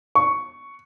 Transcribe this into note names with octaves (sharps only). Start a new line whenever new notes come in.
C#6